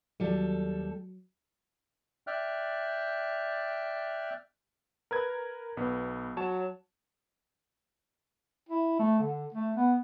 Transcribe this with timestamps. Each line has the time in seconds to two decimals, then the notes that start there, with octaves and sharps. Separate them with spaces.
0.20 D#2 F#3 G3 A4
2.27 D5 E5 G5 F6 F#6
5.11 A#4 B4 G#6
5.77 B1 B3
6.37 F#3 C#5 A5 E7
8.69 E4
8.99 A3
9.19 D3
9.54 A3
9.76 B3